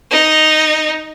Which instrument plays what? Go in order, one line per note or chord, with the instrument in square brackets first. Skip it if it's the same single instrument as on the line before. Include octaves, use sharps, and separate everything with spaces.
[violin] D#4